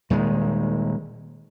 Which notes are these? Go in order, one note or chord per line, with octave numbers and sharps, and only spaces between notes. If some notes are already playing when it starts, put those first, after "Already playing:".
D#1 D#3 G#3